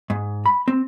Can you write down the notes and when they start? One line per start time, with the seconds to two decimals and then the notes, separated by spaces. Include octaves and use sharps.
0.10 G#2
0.46 B5
0.68 C4